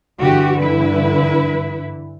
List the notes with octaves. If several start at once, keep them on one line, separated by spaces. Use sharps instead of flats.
G2 D3 E3 F#4 G4
E4 B4